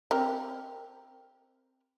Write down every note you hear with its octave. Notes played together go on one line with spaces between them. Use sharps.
C4 G4 A#4